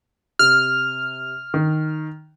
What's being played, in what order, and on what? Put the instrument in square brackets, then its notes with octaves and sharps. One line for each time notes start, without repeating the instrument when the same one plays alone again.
[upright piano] C3 [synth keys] F6
[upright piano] D#3